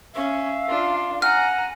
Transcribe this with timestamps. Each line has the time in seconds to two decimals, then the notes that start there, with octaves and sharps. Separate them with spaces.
0.15 C#4 E5 F5
0.67 D4 F4
1.22 F#5 G#5 A#5 F6